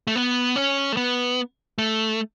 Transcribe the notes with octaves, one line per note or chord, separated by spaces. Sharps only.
A3
B3
C#4
A3
B3
A3